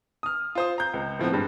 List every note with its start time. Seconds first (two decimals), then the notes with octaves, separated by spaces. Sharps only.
0.23 D#6 F6
0.55 F4 C5 D#6
0.78 A#5 G6
0.94 C#2
1.19 A2 F3 B3 C4
1.32 G2 G3 G#3